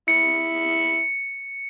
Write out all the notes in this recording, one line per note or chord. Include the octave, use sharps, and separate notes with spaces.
E4 C#7